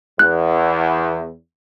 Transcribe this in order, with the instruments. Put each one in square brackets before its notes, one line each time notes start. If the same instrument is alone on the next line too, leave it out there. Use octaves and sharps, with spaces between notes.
[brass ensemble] E2 [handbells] F#6